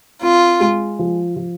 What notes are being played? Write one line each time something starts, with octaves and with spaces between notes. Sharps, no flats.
C4 F4
G#3
F3
F3